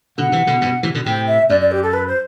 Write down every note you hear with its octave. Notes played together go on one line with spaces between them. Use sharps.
B2 D3 F#5
C3 E3
B2 D3
G2 B2
C3 E3
B2 D3
A2 C3 G5
E5
F#2 D5
D5
G4
A4
B4
C5